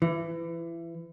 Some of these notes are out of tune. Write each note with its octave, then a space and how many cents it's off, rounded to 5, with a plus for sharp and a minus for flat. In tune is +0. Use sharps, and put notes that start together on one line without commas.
E3 +25